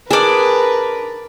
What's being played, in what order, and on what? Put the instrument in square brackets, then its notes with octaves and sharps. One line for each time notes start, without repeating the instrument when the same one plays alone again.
[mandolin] D4 D5 [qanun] G#4 [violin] A#4 B4